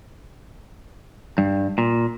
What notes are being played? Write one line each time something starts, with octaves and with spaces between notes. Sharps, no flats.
G2
A#2